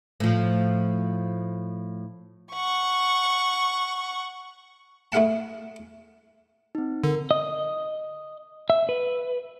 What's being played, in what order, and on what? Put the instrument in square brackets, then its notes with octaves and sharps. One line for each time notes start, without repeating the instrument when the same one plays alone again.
[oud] A2 F3
[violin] F#5 C#6
[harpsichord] A3 E4 G#4 F5 F#5 A5
[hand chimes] C4 D#4
[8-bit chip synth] D3 [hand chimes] A#4
[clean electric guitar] D#5
E5
B4